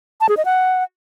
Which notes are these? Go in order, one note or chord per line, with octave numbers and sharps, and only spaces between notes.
A5
G#4
D#5
F#5